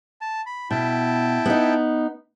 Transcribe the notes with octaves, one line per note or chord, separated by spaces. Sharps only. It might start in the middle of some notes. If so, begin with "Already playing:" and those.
A5
B5
B2 E4 G5 A5
B3 D#4